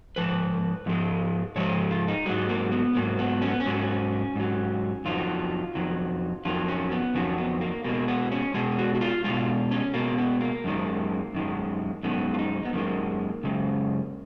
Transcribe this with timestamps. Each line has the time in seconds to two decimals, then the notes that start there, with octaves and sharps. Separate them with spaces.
0.16 G#2 F3 B4
0.86 G#2 F3 G#3
1.56 G#2 F3 G#3 C#5
1.91 F4
2.08 D#4
2.26 G#2 F#3 G#3
2.49 A#3
2.72 B3
2.95 G#2 F#3 A#3
3.19 B3
3.42 C#4
3.51 B3
3.60 C#4
3.66 G#2 F#3
4.36 G#2 F#3
5.05 F2 D#3 F#3 F4
5.75 F2 D#3 F#3
6.45 F2 D#3 F#3 F4
6.68 C#4
6.92 B3
7.15 F2 D#3 F#3 C#4
7.38 B3
7.61 A#3
7.84 B2 G#3 A#3
8.08 B3
8.32 C#4
8.54 B2 G#3 G#4
8.78 F#4
8.95 F#4
9.01 F4
9.24 B2 G#3 F4
9.71 C#4
9.94 B2 G#3 A#3
10.17 B3
10.41 A#3
10.64 F#2 D#3 G#3
11.35 F#2 D#3 G#3
12.03 F#2 D#3 G#3 B3
12.34 F4
12.39 D#4
12.65 B3
12.73 F#2 D#3 G#3 A#3
13.44 F#2 C#3 G#3